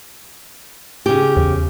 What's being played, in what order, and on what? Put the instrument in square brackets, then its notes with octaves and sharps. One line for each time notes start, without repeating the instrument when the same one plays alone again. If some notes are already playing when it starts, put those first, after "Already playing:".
[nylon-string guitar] C#3 G4
[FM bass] E2